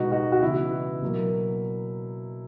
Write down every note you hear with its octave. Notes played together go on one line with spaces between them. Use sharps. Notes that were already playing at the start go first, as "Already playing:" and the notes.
Already playing: B2 G#3 B3 D#4 F#4
D#4 F#4
F#4
C#3 E3 B3 E4
B2 F#3 A#3